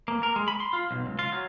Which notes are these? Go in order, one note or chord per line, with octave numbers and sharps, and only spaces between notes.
A#3
A#4
G#3
B5
C6
F4
B1
C#2
F4
F#3